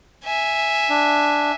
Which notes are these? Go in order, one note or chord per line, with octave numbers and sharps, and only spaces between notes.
E5 G#5
D4